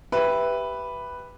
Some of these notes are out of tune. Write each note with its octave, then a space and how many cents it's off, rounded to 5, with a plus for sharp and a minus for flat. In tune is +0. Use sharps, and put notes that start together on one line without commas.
G4 +5 B4 +0 E5 +0